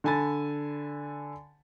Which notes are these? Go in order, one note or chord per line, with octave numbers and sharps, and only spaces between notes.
D3 A4 G#5 B5 A6